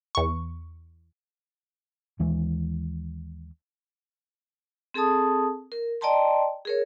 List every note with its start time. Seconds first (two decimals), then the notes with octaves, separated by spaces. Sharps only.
0.15 E2 C#6
2.19 D#2 E3 G#3
4.94 C4 G#4 A4 A5 D#6
5.72 A#4
6.01 D5 D#5 G5 A5 A#5 C6
6.65 G#4 A#4 C#5